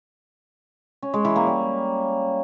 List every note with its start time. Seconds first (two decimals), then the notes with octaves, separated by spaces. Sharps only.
1.03 C#4
1.14 G#3
1.25 E3
1.36 A#3
1.47 G3